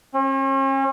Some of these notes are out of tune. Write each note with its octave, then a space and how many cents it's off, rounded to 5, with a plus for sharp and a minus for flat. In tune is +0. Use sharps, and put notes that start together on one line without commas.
C#4 -40